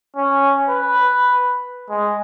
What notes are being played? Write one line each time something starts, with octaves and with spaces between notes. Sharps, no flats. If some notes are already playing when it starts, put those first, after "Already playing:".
C#4
B4
G#3